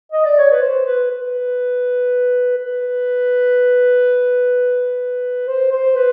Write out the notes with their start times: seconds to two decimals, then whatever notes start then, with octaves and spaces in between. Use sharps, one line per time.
0.12 D#5
0.25 D5
0.38 C#5
0.51 B4
0.61 C5
0.86 B4
1.11 B4
2.57 B4
5.48 C5
5.71 C5
5.95 B4